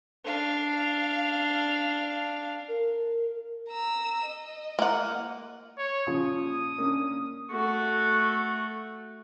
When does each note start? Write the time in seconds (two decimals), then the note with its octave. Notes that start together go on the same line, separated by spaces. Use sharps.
0.25 D4 F5
2.69 A#4
3.69 A#5 E6
4.26 D#5
4.79 A#3 F#5
5.78 C#5
6.07 A#2 C#3 F3 D#6
6.78 A#3 C#4 D4
7.51 A3 F#4